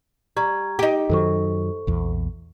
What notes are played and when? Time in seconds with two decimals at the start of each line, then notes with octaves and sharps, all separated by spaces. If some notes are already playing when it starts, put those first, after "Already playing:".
0.37 G3 A#5 C#6 G#6
0.79 D#4 G4
1.09 F#2 D#3 F#3 A4 C5 C#6
1.87 A#1 E2